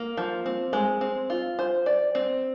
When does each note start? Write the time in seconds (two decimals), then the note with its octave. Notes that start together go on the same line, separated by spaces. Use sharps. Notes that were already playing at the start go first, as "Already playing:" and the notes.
Already playing: A#3
0.17 F3
0.46 C4
0.73 G#3
1.01 C4
1.30 F4
1.59 C5
1.86 D5
2.15 C4